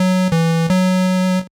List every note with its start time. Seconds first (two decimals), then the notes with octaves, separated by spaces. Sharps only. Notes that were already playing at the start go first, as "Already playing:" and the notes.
Already playing: F#3
0.32 E3
0.70 F#3